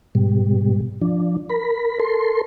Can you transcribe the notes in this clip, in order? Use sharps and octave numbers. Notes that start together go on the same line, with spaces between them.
G#2 B2 G3
F3 D4
A#4 B5
A4 A#4 C6